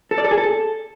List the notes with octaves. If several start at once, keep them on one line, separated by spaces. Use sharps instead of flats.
A4
D5
A4
G#4
A4